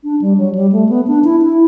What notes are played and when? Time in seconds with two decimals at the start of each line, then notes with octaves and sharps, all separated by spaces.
0.04 D4
0.21 G3
0.38 F#3
0.55 G3
0.72 A3
0.89 B3
1.07 D4
1.24 E4
1.42 E4